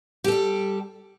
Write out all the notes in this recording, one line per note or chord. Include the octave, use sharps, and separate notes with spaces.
G3 G4 A4